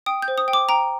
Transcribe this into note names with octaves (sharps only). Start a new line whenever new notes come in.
G5 D#6
G6
C5
D#6
G5
D6
G5 A#5